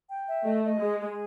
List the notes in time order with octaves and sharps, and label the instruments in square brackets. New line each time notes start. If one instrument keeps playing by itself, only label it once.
[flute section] G5
E5
[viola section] A3 [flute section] D#5
[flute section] D#5
[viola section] G#3 [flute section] G#4
[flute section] G#4